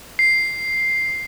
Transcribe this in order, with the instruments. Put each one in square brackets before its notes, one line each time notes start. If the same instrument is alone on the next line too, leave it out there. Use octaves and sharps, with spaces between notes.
[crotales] C7